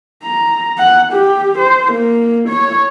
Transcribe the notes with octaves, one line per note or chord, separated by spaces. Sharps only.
A#5
F#5
G4
C5
A#3
C#5